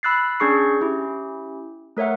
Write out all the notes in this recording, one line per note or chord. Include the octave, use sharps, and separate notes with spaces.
B5 E6 F#6 A6 C7
C#4 D4 G#4 C#6 C7
C#4 E4 G4
A3 A#4 C#5 E5 F#5